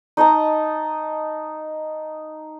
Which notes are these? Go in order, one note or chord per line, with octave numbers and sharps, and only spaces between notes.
D#4 D#5 A5 A#5